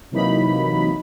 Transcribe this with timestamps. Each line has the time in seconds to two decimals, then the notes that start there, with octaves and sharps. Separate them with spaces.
0.11 C3 E3 F#3 A#3 D#4 B5